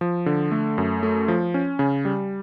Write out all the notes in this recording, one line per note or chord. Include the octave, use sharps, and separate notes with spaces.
F3
D3
A3
F#2
A3
F3
C#4
C#3
G3